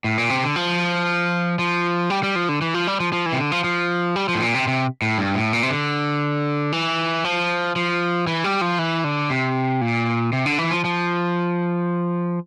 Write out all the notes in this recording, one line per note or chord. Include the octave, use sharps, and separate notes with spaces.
A2
A#2
C3
D3
F3
F3
G3
G3
F3
D3
E3
F3
G3
F3
F3
E3
C3
D3
F3
F3
G3
F3
A2
A#2
C3
C3
A2
G2
A2
A#2
C3
D3
E3
F3
F3
E3
G3
F3
E3
D3
C3
A#2
C3
D3
E3
F3
F3